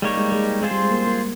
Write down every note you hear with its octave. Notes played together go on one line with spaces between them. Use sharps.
G3 G#3 A#3 D#4 G4 C#5
G#3
G#3
G#3 C4 F4 G#4 C5
G3
G#3
A#3
A#3